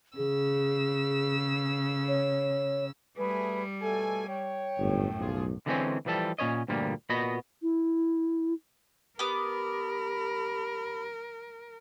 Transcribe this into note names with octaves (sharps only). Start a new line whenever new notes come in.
C#3 G#4 E6
C#5
G3 A3 G#4 B4
B2 A3 A4 G#5
C#5 G5
G1 F#2 A2
B1 F3 F4 G#4
D3 E3 G#3 A#3 C4 C#4
E3 F3 G3 A4
A#2 C#4 C#5 D#5
D2 G2 A#2 F3 G3 A#3
A#2 B3 F#4 D#5 B5
E4
B3 G4 A#4 B5 D6